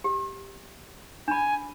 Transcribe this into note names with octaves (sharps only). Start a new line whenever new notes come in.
G4
D4 G#5 B5